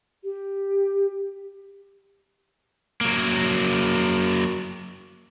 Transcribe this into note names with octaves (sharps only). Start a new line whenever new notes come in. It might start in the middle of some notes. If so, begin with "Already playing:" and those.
G4
F#3 A#3